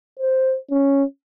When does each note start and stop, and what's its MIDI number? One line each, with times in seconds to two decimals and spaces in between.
0.20 0.57 72
0.71 1.04 61